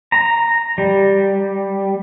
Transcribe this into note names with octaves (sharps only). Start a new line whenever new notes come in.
A#5
G3